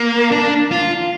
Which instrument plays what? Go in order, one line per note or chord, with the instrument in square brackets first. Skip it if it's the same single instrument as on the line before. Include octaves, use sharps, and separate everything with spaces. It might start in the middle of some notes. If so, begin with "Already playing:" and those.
Already playing: [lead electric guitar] A#3
D4
F4